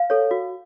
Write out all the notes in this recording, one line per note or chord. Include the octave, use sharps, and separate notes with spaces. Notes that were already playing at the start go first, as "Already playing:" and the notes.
Already playing: F5
A4 C#5
F#4